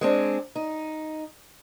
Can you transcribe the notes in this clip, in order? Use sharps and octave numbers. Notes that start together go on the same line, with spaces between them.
G#3 C4 D4
D#4